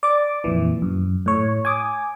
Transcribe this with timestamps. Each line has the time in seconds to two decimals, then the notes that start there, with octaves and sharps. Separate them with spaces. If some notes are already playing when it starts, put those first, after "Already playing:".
0.03 D5 D6
0.44 F2 A#2 E3
0.82 F#2
1.26 A2 C#5
1.65 G#5 D6 D#6